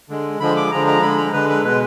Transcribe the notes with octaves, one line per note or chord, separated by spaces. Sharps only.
D3 G#3
D3 F3 G#3 B5
D6
D3 F3 G#3 A#5
A#5
D3 G#3 B5
A#5
D3 G#3 B4
B4
B2 G#3 B4